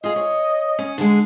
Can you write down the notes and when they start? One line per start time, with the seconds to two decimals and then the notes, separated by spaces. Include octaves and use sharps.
0.04 F4 G#4 D#5
0.16 C#5
0.79 C#4
0.98 D3 G#3